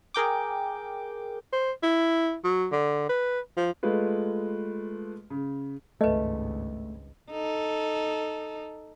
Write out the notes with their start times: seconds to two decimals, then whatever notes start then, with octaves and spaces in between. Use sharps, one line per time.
0.14 G#4 A#4 G5 D6
1.52 C5
1.83 E4
2.44 F#3
2.72 D3
3.09 B4
3.57 F3
3.83 G#3 A3 F4 B4
5.30 C#3
6.01 G#1 C#2 G2 A3 B4 D#5
7.31 D#4 A4